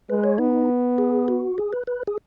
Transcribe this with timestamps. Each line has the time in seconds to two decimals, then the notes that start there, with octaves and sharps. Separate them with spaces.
0.10 G#3 B4
0.24 C#5
0.38 B3 D#4
0.98 G#4
1.28 F#4
1.58 G#4
1.73 B4
1.87 B4
2.07 G#4